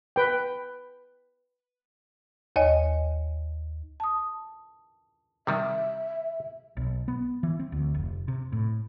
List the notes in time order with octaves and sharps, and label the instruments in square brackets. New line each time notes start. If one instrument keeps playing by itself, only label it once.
[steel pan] B4 G5
[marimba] D#2 C#5 D#5 G#5
A5 D#6
[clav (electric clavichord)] C3 D#3 G3 [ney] E5
[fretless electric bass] B1
B3
E3
C4
D2
F1
C3
A2